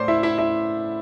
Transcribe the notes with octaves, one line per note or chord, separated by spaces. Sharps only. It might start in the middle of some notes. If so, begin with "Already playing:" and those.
Already playing: A2 C5 D5 C6 D6
E4 E5
E4 E5
E4 E5